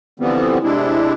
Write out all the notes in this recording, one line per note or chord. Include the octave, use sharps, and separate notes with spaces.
D3 E3 F3 G3 B3 C4
C3 G#3 D4 E4